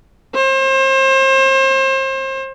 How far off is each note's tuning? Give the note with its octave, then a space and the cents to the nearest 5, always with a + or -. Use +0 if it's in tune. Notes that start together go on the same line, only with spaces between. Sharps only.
C5 +35